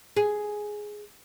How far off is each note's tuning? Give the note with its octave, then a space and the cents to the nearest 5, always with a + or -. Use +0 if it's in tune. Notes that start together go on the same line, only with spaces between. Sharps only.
G#4 +5